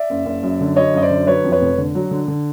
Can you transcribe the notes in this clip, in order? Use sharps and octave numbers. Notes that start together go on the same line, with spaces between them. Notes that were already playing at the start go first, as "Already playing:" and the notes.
Already playing: D5 E5
F#1
F#1
F#2
D3
F#3 C#5 D#5
F#2 D#5
C5 D5
D3
F#3 B4 C#5
F2
B4 C#5
F1
D3
F#3
D3
D3